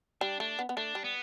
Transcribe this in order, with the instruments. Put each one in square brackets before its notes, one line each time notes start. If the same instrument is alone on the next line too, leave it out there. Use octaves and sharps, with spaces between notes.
[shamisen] G3 [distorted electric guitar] D4
[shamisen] A3 [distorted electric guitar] D4
[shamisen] B3
B3
[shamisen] A3 [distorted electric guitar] D4
[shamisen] G3
[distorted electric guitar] B3